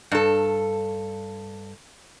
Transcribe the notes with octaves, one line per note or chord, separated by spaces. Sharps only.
G2 A4